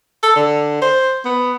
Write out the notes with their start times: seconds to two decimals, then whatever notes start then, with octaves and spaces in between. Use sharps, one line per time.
0.23 A4
0.36 D3
0.82 C5
1.25 B3